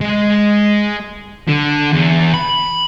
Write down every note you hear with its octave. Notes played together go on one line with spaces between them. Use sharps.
G#3
D3
E2
B5